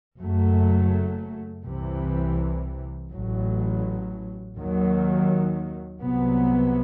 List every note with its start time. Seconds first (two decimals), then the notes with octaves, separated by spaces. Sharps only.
0.19 F#1 F#2 F#3 A3
1.65 C2 C3 E3
3.10 A1 A2 F#3
4.56 D#2 D#3 F#3
6.02 C2 C3 F#3 B3